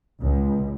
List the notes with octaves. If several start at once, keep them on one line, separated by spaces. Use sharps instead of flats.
C#2